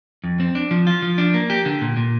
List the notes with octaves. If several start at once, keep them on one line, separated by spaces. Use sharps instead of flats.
F2
C4
D4
F3
F4
F3
D4
A#3
G4
D3
A#2
A#2